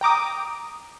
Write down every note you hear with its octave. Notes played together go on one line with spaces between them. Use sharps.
G5 A#5 D6 D#6